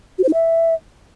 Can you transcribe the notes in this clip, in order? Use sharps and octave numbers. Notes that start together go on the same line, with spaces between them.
F#4
C5
D#4
E5